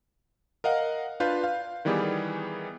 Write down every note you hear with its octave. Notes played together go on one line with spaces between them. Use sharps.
A#4 D#5 F5 F#5
D4 F4 B4 F5 G6
F5
D#3 E3 G3 B3 G4 G#4